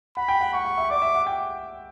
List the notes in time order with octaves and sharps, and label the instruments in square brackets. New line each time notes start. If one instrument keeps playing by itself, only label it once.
[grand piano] F#5 [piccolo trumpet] B5
[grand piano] G5
F#5
[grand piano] F#5 [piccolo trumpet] C#6
[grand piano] F#5
E5
[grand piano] D5 [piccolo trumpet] D6
[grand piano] E5
F#5
G5